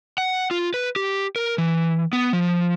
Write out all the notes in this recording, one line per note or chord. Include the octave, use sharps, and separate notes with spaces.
F#5
F4
B4
G4
A#4
E3
B3
F3